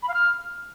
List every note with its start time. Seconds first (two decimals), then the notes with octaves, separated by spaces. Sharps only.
0.03 B5
0.08 F5
0.14 F6